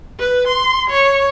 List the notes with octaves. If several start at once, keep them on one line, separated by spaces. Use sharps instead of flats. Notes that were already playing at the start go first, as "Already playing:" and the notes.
B4
C6
C#5